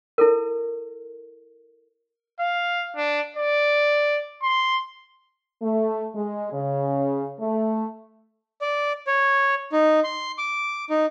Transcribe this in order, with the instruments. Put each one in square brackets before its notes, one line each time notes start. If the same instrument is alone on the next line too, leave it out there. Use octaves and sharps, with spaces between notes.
[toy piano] E4 A4 A#4
[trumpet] F5
D4
D5
C6
[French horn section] A3
G#3
C#3
A3
[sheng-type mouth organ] D5
C#5
D#4
C6
D6
D#4